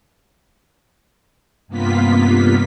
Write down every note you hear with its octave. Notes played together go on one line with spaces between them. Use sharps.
G2 C3 A#3 B3 F4 B6